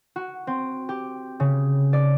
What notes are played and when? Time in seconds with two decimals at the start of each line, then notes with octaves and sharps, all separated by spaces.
0.16 F#4
0.47 C4
0.89 G4
1.40 C#3
1.93 D5